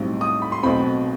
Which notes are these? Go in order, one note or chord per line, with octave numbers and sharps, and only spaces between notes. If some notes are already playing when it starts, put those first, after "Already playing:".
Already playing: B1 A2 G3 C4 D#4
D#6
B5
C6
B1 B2 A3 C4 B5